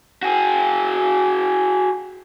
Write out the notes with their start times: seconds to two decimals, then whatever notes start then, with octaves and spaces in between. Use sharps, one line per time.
0.23 F#4 G#4